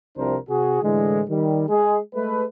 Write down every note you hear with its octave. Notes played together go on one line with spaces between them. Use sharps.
C2 C3 F3 D4 A#4 C5
C3 F#4 G#4
A2 D3 E3 G#3
D#3 G3
G#3 G#4
G#3 A3 B4